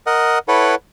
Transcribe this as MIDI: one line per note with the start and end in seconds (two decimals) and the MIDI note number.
0.07 0.39 70
0.07 0.39 75
0.07 0.39 78
0.48 0.75 64
0.48 0.75 69
0.48 0.75 71
0.48 0.75 73
0.48 0.75 78